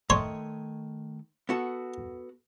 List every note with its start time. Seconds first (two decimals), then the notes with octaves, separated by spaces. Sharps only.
0.10 D#3 A3 C#5 D#5 C6
1.49 B3 F#4 A4